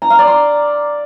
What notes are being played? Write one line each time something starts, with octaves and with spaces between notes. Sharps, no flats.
A#5
F5
D5
C6